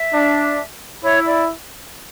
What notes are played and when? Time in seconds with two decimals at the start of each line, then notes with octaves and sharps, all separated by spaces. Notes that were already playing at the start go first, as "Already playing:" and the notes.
Already playing: E5
0.12 D4
1.04 E4 C#5
1.26 D5